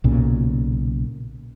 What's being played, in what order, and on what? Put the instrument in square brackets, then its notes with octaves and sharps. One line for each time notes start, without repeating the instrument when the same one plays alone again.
[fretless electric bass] B1 A#2 C#3